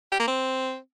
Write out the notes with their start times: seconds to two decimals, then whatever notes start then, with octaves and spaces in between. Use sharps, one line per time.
0.12 G4
0.20 A#3
0.27 C4